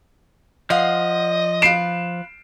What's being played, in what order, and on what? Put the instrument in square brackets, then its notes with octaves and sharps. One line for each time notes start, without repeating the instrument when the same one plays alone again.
[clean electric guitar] F3 [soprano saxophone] D#5 [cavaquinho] F5 F#5 C6
[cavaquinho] F4 B4 [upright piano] C7 D7 E7